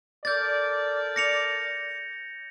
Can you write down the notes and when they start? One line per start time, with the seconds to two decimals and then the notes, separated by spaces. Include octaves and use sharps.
0.25 A4 A#4 D5 G6 A6
1.16 A#6 C#7 F7